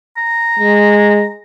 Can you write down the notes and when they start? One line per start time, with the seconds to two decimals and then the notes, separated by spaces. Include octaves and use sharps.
0.17 A#5
0.59 G#3